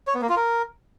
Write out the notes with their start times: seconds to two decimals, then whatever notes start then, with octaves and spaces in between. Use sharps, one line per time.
0.07 C#5
0.15 B3
0.22 A#3
0.29 F4
0.36 A#4